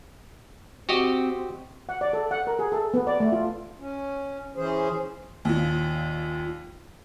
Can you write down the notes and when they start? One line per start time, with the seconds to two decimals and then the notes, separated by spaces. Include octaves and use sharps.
0.89 C4 F#4 G4 D#5
1.89 F#5
2.01 D5
2.13 A4
2.31 F#5
2.47 A#4
2.59 G#4
2.72 A4
2.94 B3
3.07 D5
3.20 A3
3.32 F4
3.79 C#4
4.56 E3 C#4 G#4 C5
5.45 D#2 A#2